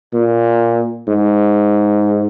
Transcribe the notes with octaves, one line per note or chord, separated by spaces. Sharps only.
A#2
G#2